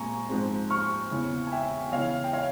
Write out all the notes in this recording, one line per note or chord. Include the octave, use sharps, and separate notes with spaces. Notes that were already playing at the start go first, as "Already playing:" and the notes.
Already playing: A#2 G#3 C4 G#5 A#5 C#6
G#2 F3 G#3 C4
C#6 F6
E2 C#3 E3
G#5
E5 G5
E2 C#3 E3 C#5 F5
G5
C#5 F5